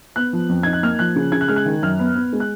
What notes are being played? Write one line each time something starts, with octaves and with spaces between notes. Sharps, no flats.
B3 F#6
F3
F2
D#4 G#6
F#6
A#3 F6
F3 F#6
C#3
C#3 G#6
F#6
G#3 F6
F#6
D#3
F#2 F6
B3
B3
G#3
F#6